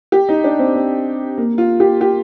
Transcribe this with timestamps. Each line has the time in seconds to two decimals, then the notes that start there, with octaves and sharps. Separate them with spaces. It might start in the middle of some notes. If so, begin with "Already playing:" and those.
0.12 G4
0.29 D#4
0.44 D4
0.59 C4
0.75 C4
1.38 A#3
1.58 F4
1.80 G4
2.01 G4